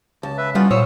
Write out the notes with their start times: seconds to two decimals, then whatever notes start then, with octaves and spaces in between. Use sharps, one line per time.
0.23 C#2 A5
0.37 B4 E5
0.55 A2 G3 B3 C#4 F4 F#5
0.71 B1 A#2 C5 C#5 D#6 E6